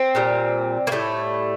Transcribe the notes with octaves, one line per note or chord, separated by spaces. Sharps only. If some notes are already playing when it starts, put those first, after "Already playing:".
Already playing: C4
A#2 G3
A#3
A2 G3 A3